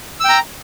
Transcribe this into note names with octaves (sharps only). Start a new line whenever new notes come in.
G5 A#5 E6